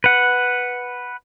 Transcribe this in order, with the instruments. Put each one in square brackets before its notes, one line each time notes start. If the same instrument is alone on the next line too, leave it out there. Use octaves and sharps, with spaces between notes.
[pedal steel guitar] B4 F#5